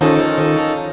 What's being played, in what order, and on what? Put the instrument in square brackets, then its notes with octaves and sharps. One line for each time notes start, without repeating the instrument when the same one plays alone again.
[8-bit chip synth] D#3 D#4 A4 [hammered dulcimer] F3 C#4